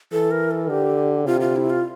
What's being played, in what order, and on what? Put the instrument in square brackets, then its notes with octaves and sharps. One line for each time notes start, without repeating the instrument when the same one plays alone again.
[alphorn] E3 [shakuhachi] A4
[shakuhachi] A#4
A4
[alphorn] D3 [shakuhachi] G4
[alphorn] C3 [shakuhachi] F4
[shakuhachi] F4
E4
F4